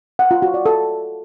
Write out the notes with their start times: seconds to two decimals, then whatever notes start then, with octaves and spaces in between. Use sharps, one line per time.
0.19 F#5
0.31 F4
0.42 F#4
0.54 D5
0.66 A4